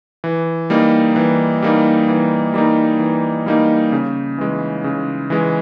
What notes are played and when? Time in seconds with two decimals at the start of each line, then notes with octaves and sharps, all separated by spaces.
0.24 E3
0.70 G3 A#3 D#4
1.16 E3
1.62 G3 A#3 D#4
2.08 E3
2.54 G3 A#3 D#4
2.99 E3
3.46 G3 A#3 D#4
3.92 C#3
4.38 E3 G#3
4.84 C#3
5.30 E3 G#3